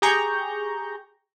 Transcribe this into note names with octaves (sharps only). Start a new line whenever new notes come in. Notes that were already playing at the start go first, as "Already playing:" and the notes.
G4 G#4 G5 A#5 C#6 G6